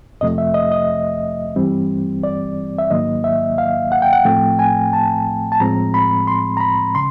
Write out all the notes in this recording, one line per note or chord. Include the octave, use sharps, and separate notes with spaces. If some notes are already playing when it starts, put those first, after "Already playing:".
F2 C3 F3 A3 D#5
E5
D#5
D#5
G2 E3 G3 C4
D5
E5
G#2 D#3 F#3 A#3 D#5
E5
F5
F#5
G5
F#5
A2 F3 A3 C4 G5
G#5
A5
A5
A2 F3 G#3 C4 A#5
B5
C6
A#5
B5
C#3 C6